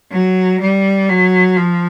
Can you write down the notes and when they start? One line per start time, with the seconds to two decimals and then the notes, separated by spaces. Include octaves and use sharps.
0.12 F#3
0.61 G3
1.09 F#3
1.57 F3